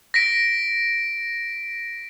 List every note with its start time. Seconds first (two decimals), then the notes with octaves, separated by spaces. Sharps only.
0.14 A#6 B6 D7